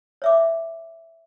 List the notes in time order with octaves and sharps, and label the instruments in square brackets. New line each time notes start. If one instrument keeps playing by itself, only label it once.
[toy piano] C#5 E5 D6